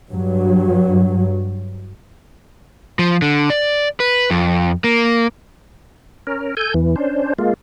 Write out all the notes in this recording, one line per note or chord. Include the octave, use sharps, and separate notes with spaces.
G2 F#3
F3
D3
D5
B4
F2
A#3
C#4 A#4
A4 G#5 G6
E2 E3
C#4 D4 C5
G#3 A#3 F4